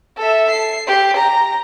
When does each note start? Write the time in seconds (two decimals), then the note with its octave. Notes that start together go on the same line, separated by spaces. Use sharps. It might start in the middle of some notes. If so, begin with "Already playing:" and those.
0.18 A4 E5
0.51 C7
0.87 G4
1.17 A#5